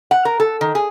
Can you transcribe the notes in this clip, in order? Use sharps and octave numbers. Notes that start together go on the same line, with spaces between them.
F#5
A#4
A4
D#3
G#4